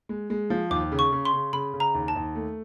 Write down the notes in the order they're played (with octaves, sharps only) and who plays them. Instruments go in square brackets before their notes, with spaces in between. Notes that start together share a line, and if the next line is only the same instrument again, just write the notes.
[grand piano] G#3
G#3
F3
[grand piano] D#2 [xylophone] D6
[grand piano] C#3
[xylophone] C#6
[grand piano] C#3
[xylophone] C6
[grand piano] C#3
[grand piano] C#3 [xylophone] B5
[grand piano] C#3
[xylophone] A#5
[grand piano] D#2
[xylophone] A5
[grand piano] D#2
A3